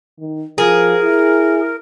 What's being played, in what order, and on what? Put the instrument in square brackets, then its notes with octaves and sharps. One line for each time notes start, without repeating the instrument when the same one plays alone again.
[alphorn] D#3
[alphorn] F3 [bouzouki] G#4 [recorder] A#4
[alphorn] E4